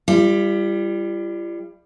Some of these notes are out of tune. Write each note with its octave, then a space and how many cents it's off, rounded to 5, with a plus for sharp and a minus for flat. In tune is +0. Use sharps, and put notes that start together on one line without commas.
G3 +15 F4 -45